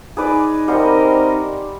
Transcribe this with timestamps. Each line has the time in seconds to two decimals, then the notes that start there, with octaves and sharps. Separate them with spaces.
0.17 D#4 G#4 B4 D5
0.68 G3 C4 A#4 D#5 F#5 C6